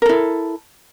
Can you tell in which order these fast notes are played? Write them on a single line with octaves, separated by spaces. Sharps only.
A#4 A4 E4